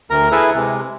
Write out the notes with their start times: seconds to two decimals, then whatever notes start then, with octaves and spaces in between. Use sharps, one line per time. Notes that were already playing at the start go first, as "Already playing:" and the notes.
0.10 D2 A#4 A#5
0.32 E4 G#4 A4 B4 E5
0.55 C3 G#3